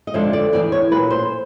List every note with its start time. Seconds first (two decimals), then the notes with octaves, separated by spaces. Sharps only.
0.07 D#5
0.14 F2 D3 F3 G#3 E5
0.33 D5
0.53 E2 C#3 E3 D5
0.72 C#5
0.91 A#2 B4
0.95 F#3
1.11 C5